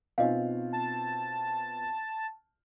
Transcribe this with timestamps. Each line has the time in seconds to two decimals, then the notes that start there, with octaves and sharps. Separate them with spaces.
0.18 B2 C4 D#4 F4 D#5 F5
0.73 A5